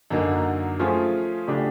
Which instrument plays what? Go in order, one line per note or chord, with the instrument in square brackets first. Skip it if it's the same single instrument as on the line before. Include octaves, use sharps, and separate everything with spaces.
[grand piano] F#2 D3 F#3 A#3 D#4
F3 A3 C#4 F4 G#4
C#3 F#3 A3 D4 G4